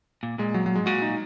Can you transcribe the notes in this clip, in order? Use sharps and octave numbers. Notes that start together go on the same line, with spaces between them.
A#2
A#2 G#3
F#3
F#3
G#2 G#3
A#2 F#4
D#4